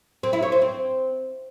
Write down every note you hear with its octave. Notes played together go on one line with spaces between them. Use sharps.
C4
E4
C#5
C5
C4